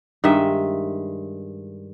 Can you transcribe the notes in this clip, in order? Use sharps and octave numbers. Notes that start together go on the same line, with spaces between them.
G2 D#3 G#3 E5